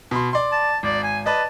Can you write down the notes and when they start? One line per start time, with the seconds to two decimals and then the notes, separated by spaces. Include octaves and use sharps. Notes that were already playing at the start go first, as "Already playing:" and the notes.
0.11 B2 B5 C6
0.33 D5 C6
0.52 A5
0.83 G#1 D5
1.04 G#5
1.26 B4 D5 D#5 A5